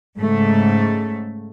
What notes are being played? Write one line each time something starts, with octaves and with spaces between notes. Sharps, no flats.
G#2 C#3 A3